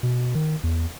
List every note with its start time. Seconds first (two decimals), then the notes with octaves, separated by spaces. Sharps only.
0.03 B2
0.35 D#3
0.63 E2